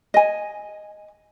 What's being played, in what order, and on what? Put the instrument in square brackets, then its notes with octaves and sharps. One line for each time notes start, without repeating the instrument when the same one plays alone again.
[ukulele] D#5 G#5